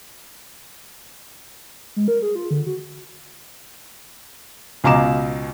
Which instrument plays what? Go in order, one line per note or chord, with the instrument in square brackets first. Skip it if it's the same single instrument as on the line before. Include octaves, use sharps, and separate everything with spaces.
[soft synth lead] G#3
A#4
G#4
F4
D3
F#4
[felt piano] C#2 B2 F5 A#5 D6 E7